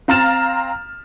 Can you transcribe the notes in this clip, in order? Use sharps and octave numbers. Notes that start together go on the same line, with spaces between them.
C4 F5 A#5 F6 A6 E7